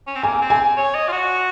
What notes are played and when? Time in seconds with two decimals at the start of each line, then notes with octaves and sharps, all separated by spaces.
0.07 C#4
0.15 C4
0.23 A#3 G#5
0.41 C4
0.50 G#5
0.77 C#5
0.95 D#5
1.08 F4
1.12 F#4